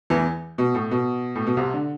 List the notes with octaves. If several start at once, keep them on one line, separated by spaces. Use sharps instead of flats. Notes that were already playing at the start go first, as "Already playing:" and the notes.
E2 E3
B2
A2
B2
A2
B2
C2 C3
D3